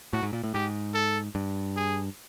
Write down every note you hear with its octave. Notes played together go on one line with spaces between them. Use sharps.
A2 F#4
G#2
A#2
A2
G#2 G4
A4
G2
G#4